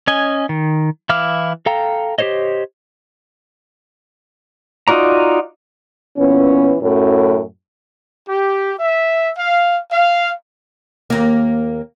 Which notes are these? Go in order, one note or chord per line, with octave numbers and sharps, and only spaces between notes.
C#4 D#5 G#5
D#3
E3 E4 F5 D6 F6
A4 F5 G5 A#5
G4 A4 C5 C#5 D#5
D#4 F4 F#4 D5 A#5
A#2 E3 B3 C#4
F#2 A2
G4
E5
F5
F5
D#2 A#3